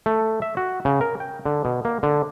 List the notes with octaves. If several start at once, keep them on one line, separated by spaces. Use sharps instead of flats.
A3
E5
F#4
C#3
A#4
G5
D3
B2
A#3
D3